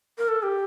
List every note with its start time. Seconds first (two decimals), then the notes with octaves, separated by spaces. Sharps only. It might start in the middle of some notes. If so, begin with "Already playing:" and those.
0.18 A#4
0.28 A4
0.43 G4